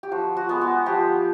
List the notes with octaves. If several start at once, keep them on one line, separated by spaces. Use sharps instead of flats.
G4
F3 F#4
F#4
G#3 B3
F#4
F3 G4